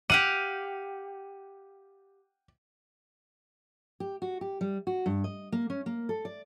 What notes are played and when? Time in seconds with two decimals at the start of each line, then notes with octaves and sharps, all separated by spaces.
0.10 G4 F5 F#5 D#7
4.00 G4
4.22 F#4
4.41 G4
4.61 G3
4.87 F#4
5.06 G2
5.24 D#5
5.52 A#3
5.70 C#4
5.86 A#3
6.09 A4
6.25 D5